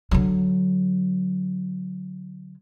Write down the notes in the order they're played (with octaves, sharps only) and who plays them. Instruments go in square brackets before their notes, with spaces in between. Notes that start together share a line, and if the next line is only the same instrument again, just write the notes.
[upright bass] D3 F#3